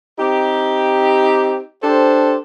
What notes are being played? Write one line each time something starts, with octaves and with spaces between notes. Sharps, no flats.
C4 D#4 G4
D4 G4 A4 C5